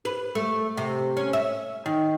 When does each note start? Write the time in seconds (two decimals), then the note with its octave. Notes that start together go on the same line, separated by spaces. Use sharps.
0.05 B4
0.35 A3
0.77 C3
1.17 C#4
1.33 E5
1.86 D#3